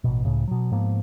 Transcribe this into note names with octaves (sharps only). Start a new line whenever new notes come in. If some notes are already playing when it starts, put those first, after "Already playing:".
A1 B2
C#2 A2 C#3
B2 F#3
G#2 F3 A#3 B3